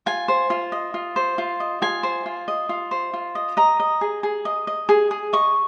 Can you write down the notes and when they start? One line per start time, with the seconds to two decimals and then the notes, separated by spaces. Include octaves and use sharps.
0.06 F4 G#5
0.28 C5
0.50 F4
0.72 D#5
0.94 F4
1.16 C5
1.38 F4
1.60 D#5
1.82 F4 G#5
2.03 C5
2.26 F4
2.48 D#5
2.69 F4
2.91 C5
3.14 F4
3.35 D#5
3.57 D#5 A#5
3.80 D#5
4.01 G#4
4.23 G#4
4.45 D#5
4.67 D#5
4.89 G#4
5.11 G#4
5.33 D#5 C#6